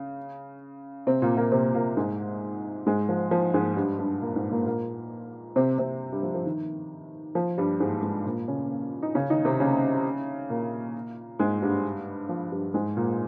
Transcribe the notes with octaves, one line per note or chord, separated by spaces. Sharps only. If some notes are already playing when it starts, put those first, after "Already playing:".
Already playing: C#3
C3 C4
A#2 A#3
A#2 A#3
C3 C4
A#2 A#3
G#2 G#3
G#2 G#3
F3
F3
G#2 G#3
G2 G3
G2 G3
A#2 A#3
G#2 G#3
A#2 A#3
A#2 A#3
C3 C4
C3 C4
G2 G3
F3
F3
D#3
F3
G2 G3
G#2 G#3
G#2 G#3
A#2 A#3
C#3 C#4
D#4
C#3 C#4
D#3 D#4
C3 C4
C#3 C#4
A#2 A#3
G#2 G#3
G2 G3
F3
G2 G3
G#2 G#3
A#2 A#3